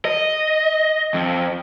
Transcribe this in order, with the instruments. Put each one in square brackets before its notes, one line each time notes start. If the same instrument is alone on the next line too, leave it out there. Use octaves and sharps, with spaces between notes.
[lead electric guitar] D#5
F2